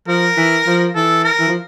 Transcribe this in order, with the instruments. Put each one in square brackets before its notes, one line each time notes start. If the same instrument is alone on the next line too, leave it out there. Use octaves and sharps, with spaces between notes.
[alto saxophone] F3 [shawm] A#4
[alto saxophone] E3
F3
[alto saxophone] E3 [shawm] A4
[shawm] A#4
[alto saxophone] E3
F3